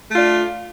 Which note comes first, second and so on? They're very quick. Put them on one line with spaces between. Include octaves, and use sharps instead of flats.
A3 F4 D4